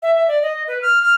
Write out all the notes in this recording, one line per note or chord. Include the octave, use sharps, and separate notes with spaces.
E5
E5
D5
D#5
B4
F6
F6